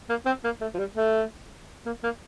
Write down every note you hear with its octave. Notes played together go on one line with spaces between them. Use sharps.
A#3
C4
A#3
A3
F3
G3
A3
A#3
A#3